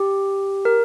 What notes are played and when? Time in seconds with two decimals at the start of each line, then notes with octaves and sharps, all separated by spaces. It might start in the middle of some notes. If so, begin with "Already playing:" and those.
Already playing: G4
0.65 A#4